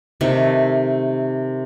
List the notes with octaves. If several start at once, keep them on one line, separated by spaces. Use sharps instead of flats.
C3 D#3 A3 E5